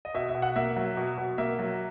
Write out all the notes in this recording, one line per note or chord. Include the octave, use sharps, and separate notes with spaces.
D#5
B2 E5
E5
B2
F#5
A#3 E5
F#3
B2
B2
A#3 E5
F#3